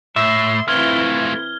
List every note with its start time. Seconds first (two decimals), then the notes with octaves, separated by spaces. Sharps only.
0.16 A2 E5 C6 E6
0.68 E3 A3 C4 E4 F4 F6 G#6 G7